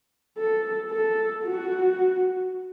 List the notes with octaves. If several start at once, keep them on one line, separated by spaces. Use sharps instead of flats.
A4
A4
F#4